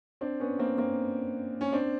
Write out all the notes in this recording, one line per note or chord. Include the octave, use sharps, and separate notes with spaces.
C4 D4
B3 C#4
A#3 C4
A#3 C4
C#4
C4 D4